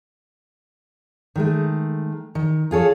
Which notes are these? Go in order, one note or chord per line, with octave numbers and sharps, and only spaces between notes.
D#3 G#3 A3
D#3
F4 G#4 A4 C#5